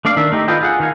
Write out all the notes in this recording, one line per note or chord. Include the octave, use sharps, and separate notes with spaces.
A3 D4 D5 F5
D#3 D4 E5
A3 D#4 G4
F4 A4 B4 D#5 G5
F4 G#4 F#5
D#3 D#4 F5 G#5